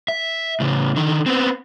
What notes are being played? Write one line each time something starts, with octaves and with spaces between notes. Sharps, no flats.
E5
A2 C#3
D3 D#3
B3 C4